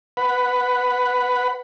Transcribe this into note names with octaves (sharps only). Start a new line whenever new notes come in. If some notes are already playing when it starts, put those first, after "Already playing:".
B4 F#5 B5